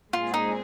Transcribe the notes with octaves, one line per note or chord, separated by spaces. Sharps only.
A#2 G#3 C4 F4 G#4
D#4